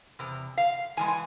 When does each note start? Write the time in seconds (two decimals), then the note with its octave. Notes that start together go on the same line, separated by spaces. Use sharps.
0.19 E2 C3
0.58 F5
0.97 E2 E3 G#3 G#5
1.08 G#5